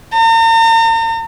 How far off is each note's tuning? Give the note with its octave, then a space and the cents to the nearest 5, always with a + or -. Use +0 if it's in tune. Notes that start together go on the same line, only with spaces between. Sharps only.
A#5 -45